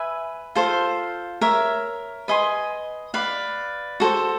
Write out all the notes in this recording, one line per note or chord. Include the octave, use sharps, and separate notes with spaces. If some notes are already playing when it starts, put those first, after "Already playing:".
Already playing: B4 E5 G#5
F4 A4 C5 F5
A#4 C#5 E5
B4 D#5 G#5 C6
B4 D5 F5
F#4 A4 C5